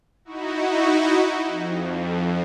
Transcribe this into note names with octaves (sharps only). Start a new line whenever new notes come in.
D#4 E4 F#4
F2